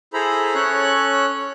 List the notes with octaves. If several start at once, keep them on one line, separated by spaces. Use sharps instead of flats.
E4 G#4 A4 C5 A#5 B5
C#4 A4 C#5 F#6